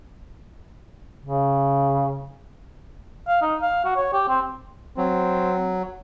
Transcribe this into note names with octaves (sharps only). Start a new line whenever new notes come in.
C#3
F5
D#4
F5
F#4
C#5
G4
C4
F#3 C4